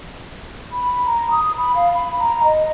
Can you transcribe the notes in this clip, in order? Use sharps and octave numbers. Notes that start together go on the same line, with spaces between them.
B5
A#5
D#6
B5
F5
B5
A#5
D#5